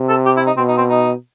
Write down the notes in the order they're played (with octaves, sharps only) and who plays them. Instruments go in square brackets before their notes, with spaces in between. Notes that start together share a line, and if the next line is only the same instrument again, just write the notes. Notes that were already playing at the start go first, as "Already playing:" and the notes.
Already playing: [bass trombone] C3
[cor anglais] A4
G4
E4
D#4
[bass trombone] B2 [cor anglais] C4
[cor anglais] D#4
C4
D#4